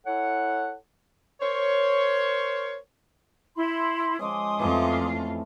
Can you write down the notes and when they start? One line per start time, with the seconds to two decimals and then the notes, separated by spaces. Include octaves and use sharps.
0.06 E4 A4 C#5 F#5
1.41 A#4 C5 C#5
3.56 E4 B5 C6
4.19 F3 G#3 C#4 C6 D6 D#6
4.59 F2 E3 F3 A3 F4